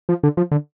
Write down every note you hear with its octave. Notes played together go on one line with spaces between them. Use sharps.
F3
D3
F3
D3